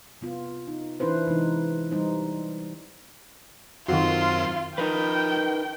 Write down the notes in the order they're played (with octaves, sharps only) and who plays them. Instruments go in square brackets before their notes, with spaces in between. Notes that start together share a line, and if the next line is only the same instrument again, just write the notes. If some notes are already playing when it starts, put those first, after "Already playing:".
[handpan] C3 B3 F4
D#4
E3 D4 E4 B4 C5
C3 E3 G#3 D#4
G3 D#4 C5
[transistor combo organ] F#2 C4 C6 [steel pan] D#3 F#4 [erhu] F4
[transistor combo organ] F3 [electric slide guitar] D#4 A#4 B4 [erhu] G5